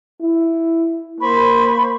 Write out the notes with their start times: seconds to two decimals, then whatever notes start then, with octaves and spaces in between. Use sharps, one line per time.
0.21 E4
1.20 A#3 C5 B5 C#6